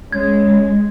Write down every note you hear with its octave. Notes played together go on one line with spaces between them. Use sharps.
G#3 C#4 G#6